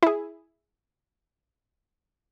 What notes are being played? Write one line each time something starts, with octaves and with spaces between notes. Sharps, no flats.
E4 G#4